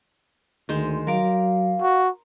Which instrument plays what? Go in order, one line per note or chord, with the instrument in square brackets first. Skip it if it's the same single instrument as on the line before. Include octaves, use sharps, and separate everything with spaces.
[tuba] D2 [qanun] D#3 G#3 C5
[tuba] F#3 [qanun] A#4 D6 [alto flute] F5
[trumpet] F#4